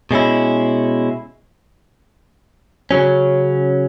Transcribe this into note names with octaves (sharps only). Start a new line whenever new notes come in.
B2 G#3 C#4 E4
C#3 F#3 C#4